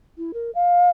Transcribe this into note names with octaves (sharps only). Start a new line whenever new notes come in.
E4
A#4
F5